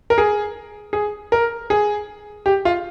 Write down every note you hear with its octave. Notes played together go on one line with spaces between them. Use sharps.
A#4
G#4
G#4
A#4
G#4
G4
F4